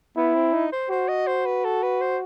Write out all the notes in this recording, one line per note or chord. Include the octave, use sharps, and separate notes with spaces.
B3 E4
C4
D#4
C5
F#4 C5
D#5
C5
B4
A4
B4
C5